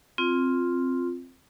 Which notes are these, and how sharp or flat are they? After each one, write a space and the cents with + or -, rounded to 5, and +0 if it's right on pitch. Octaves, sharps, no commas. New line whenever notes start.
C4 +5 F4 +0